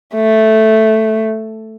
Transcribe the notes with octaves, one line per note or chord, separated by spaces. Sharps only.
A3